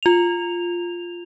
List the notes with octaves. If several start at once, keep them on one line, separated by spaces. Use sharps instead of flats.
F4 F7